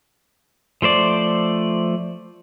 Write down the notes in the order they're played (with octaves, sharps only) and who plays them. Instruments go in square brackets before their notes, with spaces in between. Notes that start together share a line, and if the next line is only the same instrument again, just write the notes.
[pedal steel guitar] F3 A3 C5 D5